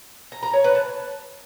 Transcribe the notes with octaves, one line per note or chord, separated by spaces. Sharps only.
A#5
A#5
C#5
B4
A5